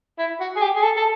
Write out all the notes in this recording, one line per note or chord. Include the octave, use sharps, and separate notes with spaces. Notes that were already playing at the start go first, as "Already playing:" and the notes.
E4
F#4
G#4
G4
G#4
A4
A4